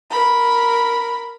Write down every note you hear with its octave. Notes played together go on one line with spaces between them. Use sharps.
A#4 B5